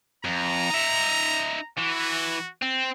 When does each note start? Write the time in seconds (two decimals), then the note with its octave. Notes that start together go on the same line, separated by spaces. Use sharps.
0.25 F2 A#5
0.70 D#4 E5
1.78 E3 F#4
2.62 C4